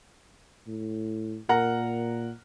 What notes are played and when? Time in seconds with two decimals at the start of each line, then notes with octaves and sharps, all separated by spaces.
0.67 A2
1.49 A#2 A#4 F#5 A#5